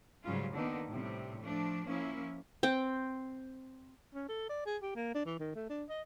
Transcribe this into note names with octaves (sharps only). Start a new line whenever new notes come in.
G#2 C#3 F#3 G3 F4
D3 D#3 A#3 B3 D#4
A2 C3 G3
F3 A3 D4
F3 A#3 C#4 E4
C4 G5
C#4
A4
D5
G#4
G4
A#3
D4
E3
D#3
A3
D4
D#5